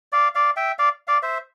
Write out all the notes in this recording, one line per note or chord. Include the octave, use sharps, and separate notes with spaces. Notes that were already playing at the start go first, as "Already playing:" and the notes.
D5 F5
D5 F5
E5 G5
D5 F5
D5 F5
C5 E5